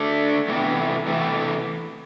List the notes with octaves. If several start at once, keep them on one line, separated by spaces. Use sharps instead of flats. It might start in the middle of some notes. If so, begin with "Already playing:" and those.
Already playing: D3 A3 D4
E2 C3 E3 A3
E2 C3 E3 A3